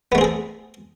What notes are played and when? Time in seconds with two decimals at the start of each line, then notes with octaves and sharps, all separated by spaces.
0.12 B3
0.15 A3
0.18 C4
0.21 G#4
0.24 A4